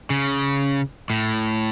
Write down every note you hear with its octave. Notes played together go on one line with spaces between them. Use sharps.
C#3
A2